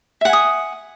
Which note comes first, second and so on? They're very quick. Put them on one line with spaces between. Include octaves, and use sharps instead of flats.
E5 F#5 G#5 D#6